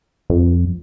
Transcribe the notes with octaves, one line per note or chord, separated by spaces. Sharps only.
F2